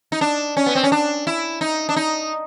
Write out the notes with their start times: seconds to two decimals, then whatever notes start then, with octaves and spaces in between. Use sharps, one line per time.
0.12 D#4
0.21 D4
0.57 C#4
0.66 B3
0.75 C4
0.84 C#4
0.92 D4
1.27 E4
1.61 D#4
1.89 D4
1.96 D#4